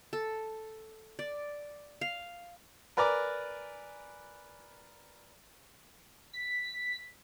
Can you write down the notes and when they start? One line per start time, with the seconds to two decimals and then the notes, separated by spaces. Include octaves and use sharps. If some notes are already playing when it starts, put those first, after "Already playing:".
0.13 A4
1.19 D5
2.01 F5
2.97 A#4 B4 D5 G#5 A#5 D6
6.33 B6